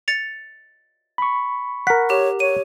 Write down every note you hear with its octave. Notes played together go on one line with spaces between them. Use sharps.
A6 C#7 F7
B5 C#6
A#4 F#5 B6
G4 C#5 E7
C#5 D#7